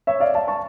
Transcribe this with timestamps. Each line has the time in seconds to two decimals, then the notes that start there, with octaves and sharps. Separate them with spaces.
0.07 C#5 E5
0.20 D5 F5
0.34 F5 A5
0.47 A5 C#6